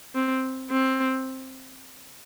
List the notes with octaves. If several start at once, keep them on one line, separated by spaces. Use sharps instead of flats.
C4
C4